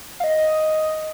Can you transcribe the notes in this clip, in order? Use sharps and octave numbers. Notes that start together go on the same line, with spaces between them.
F5
D#5